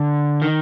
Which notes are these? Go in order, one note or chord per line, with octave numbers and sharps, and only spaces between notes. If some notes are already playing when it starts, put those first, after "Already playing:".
Already playing: D3
D#3